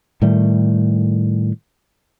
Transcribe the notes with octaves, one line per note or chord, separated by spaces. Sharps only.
A2 D#3 G3 A3